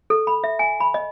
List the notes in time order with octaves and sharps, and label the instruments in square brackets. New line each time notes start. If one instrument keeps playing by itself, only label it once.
[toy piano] A4
B5
E5
G#5
B5
D#5